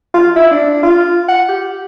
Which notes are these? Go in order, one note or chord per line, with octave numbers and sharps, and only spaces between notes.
F4
E4
D4
F4
F#5
G4